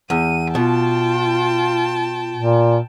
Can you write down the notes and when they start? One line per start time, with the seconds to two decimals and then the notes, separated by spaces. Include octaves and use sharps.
0.10 E2 D#7
0.55 B2 F4 G5 A5
2.36 A#2